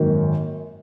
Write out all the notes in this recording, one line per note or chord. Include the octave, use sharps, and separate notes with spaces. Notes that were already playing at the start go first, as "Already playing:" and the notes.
Already playing: G#1 F#2 D#3 A#3